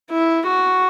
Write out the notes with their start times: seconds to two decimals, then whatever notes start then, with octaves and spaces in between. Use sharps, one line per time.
0.11 E4
0.48 F#4